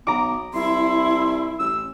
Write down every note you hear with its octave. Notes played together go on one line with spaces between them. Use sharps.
B1 B3 A#5 D6
C2 E4 C6
A1 E6